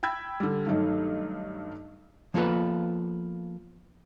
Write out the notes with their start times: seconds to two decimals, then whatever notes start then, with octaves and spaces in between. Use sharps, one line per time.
0.03 G5 B5 E6 G#6
0.40 D3 G3
0.66 G2 D#3 F#3 A3 D#4
2.34 F3 A#3 B3 F4 A4 B4